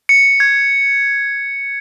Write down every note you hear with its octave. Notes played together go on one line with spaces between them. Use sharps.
C#7
G#6